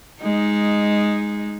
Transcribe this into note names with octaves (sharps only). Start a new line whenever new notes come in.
G#3 D#4